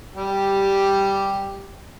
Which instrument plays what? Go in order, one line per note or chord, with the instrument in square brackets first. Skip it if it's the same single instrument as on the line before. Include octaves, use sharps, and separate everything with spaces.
[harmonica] G3 G4